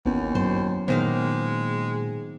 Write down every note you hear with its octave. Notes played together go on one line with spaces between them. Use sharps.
G#1 D#2 B3 C#4 E4
F#2 F#3 C5
A#2 D#3 G#3 A#3 B3 C5 F5